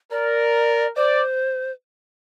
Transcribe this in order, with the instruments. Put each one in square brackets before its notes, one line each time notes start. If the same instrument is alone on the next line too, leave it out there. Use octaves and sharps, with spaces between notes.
[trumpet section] A#4 [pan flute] D5
[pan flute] C5 [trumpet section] D5